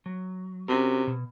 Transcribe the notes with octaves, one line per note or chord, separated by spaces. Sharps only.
F#3
C3 C#4 F#4 A#4
B2